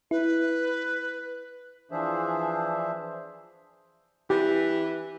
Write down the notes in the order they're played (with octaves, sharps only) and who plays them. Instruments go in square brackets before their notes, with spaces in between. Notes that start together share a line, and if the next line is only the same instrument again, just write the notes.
[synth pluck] E4 [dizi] B4
[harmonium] E3 F3 D4 G#4 C5 E5
[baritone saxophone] E3 [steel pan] G4